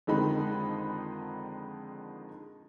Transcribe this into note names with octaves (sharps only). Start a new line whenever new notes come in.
F2 D3 D#3 G#3 D#4 B5